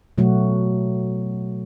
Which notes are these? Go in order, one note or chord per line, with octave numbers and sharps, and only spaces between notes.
B2 F#3 A3 F#4